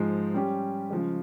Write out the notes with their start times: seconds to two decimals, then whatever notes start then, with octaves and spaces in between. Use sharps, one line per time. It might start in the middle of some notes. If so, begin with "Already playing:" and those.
Already playing: G#2 F3 G#3
0.34 G3 C#4 G4
0.90 C#3 F3 G#3